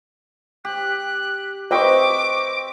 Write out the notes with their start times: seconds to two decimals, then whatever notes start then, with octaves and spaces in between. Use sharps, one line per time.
0.65 G4 F#6
1.71 C4 B4 D#5 E5 G5 C#6 D6